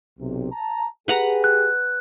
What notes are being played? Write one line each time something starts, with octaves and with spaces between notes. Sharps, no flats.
B1 C3
A5 A#5
G4 G#4 B4 F#5 A#5
F#6